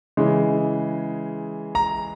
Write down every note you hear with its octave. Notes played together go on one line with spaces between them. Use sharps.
C#3 E3 G#3
A#5